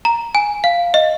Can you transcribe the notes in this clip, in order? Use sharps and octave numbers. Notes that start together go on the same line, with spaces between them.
A#5
G#5
F5
D#5